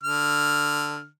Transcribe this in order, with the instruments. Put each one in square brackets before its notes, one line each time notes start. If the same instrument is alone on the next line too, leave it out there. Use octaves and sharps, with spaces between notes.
[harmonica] D3 F6